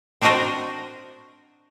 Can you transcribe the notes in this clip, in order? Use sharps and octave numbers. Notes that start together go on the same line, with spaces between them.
C4 D4 D#4 F#4 A#4 C5